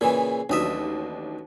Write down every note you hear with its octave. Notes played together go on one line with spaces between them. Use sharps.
A#2 C#3 E3 G#4
A1 D#2 F#3 D4 D#5 E5